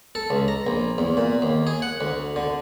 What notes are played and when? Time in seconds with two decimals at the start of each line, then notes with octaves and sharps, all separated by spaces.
0.15 A4
0.30 C#2
0.48 A#5
0.67 A#1
0.98 E2
1.17 A#2
1.42 D#2
1.67 G#4
1.82 F#5
2.01 D2
2.36 D3